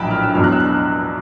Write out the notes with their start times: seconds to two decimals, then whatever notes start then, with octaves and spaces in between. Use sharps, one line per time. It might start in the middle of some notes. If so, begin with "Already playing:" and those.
Already playing: A#1 A2 F#3 G5 A5 B5
0.11 F6
0.23 E6
0.35 E2 B2 F#3 F6
0.44 F#6
0.52 E6
0.60 F#6